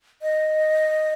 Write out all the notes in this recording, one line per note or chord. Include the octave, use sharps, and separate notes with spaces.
D#5